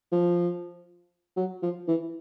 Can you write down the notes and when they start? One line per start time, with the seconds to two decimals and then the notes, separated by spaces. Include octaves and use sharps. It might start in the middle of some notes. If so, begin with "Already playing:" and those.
0.12 F3
1.37 F#3
1.62 F3
1.88 E3